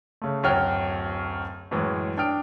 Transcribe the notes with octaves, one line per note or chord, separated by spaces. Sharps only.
C#3 A3
D1 F#2 F#4 C#5 G5 F6
F#2 A2 E3 G#3
D4 G5 D#6 F6 D7